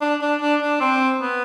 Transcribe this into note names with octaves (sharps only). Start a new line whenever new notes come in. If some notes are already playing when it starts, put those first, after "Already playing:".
D4
D4
D4
D4
C4
B3